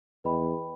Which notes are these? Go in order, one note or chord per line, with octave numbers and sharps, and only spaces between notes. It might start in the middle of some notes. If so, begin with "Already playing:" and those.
E2 B4 D#5 G5 B5